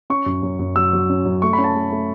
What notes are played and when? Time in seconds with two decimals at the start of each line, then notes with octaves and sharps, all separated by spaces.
0.10 C#4 C#6
0.26 F#2
0.43 F#2
0.59 F#2
0.75 F#3 E6
0.93 F#3
1.10 C#4
1.26 F#2
1.42 A3 C#6
1.53 B5
1.58 C#4
1.64 A5
1.75 A3
1.92 A3